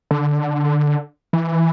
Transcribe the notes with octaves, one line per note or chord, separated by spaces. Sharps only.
D3
E3